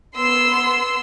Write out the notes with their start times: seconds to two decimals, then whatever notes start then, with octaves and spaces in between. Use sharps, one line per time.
0.17 B3 C6 E6 C7